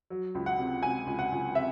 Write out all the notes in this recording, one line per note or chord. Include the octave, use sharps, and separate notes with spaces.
F#3
C#2
F#5
C3
C3 G#5
C#2
F#5
C#2
C3 E5